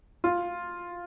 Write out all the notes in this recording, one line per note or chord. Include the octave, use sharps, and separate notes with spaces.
F4